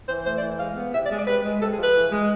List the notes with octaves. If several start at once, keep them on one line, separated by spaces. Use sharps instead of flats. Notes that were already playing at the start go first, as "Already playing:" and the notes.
E3 C5
A3 C5
D5
E3
G#3 F5
B3
C3 E5
D5
G#3
D5
C3 B4
G#3
C3 A4
G#4
F3
B4
E3
G#3